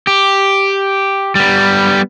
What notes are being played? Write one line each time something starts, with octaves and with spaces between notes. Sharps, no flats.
G4
G3 B3